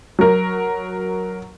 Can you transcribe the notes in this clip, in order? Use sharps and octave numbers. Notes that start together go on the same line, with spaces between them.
F#3 A#4